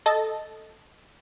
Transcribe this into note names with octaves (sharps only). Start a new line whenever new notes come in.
A4 D#5 A5